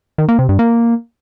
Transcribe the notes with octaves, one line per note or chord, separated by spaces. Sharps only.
D#3
A#3
C3
G2
A#3